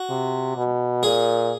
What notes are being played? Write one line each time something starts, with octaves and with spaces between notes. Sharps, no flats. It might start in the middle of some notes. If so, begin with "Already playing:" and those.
Already playing: F#4
C3
B2
A#2 G#4